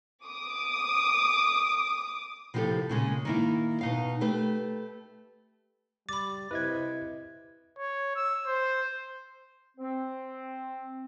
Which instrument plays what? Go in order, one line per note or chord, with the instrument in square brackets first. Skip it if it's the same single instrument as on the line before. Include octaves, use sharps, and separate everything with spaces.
[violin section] D6 D#6
[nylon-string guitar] C3 F3 E4 F#4 G4 A4
A#2 C#3 G#3
D#3 A#3 E4
B2 D#4 F5
A3 G4 B4
[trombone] G3 [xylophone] B5 D6 [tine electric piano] A6
[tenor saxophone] C3 [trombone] E4 [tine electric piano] B4 D#5 G#6
[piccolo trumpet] C#5
E6
C5
[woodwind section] C4